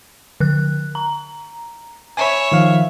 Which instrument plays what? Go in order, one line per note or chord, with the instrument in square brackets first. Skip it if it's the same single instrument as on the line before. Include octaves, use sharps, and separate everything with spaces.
[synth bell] D3 F#6
A#5
[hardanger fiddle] C#5 E5 [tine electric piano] G#5 B5
[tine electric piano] D#3 F3 F5